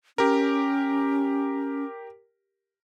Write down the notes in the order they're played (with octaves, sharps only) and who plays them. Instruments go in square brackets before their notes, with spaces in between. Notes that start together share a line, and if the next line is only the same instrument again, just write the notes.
[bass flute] C#4 [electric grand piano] G4 A#4